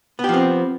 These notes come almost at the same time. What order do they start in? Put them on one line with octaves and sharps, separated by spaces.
B3 G4 F3 C4